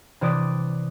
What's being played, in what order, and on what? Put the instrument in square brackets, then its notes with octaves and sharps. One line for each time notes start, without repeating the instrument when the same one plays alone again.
[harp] C3 E3 D5 D#6